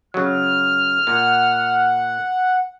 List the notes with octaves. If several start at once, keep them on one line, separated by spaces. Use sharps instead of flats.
C#3 F#3 F6
A#2 F#5